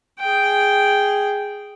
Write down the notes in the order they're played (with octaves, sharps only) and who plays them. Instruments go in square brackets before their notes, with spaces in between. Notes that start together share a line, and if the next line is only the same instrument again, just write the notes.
[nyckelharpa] G#4 G5